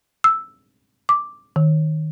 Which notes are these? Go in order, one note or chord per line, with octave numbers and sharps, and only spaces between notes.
E6
D6
D#3